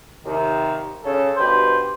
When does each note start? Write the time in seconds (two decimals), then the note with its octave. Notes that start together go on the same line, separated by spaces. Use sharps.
0.24 D#2 C3 D#3
1.04 C#3 A4
1.37 G2 B2 G4 B4 C5 C6